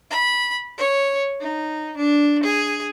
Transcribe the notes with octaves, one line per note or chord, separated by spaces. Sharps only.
B5
C#5
D#4
D4
G#4